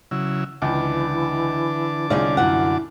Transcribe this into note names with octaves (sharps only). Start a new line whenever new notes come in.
C#3 F#3 E4
C#2 D3 E3 A5 D6
C2 C#4 D#4 F4 G#4 D5
F#2 E4 F#5